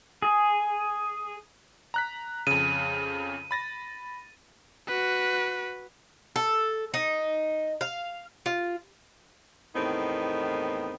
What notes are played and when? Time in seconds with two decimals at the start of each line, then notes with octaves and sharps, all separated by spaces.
0.22 G#4
1.94 A#5 F#6 B6
2.47 F2 C#3 D#7
3.51 B5 A6 A#6
4.88 F#4 B4
6.36 A4
6.94 D#4
7.81 F5
8.46 F4
9.75 E2 A2 D#3 B3 C4 D#4